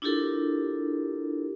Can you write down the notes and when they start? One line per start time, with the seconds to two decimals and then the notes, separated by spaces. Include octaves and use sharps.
0.02 D4 E4 F4 G4 A4 A#4